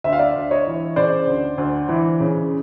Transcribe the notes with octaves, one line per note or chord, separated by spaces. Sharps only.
D2 E5
F5
D5 E5
D2
C#5 D#5
E3
C#3 C5 D5
D2
D2
E3
C#3